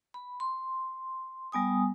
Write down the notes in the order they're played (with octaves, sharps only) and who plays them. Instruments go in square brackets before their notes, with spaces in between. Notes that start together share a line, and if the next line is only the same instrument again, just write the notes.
[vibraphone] B5
C6
G3 B3 G#5 D#6